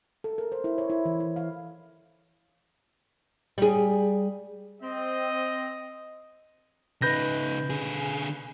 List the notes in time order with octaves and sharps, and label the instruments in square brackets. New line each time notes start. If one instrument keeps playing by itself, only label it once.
[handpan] A4
A#4
C5
E4
C#5
E4
E3
E4
F5
[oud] G3 G#4
[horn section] C4 [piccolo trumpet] D#5
[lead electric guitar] C#3 D#4 [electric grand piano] B4 G6 A#6
[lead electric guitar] D3 G#4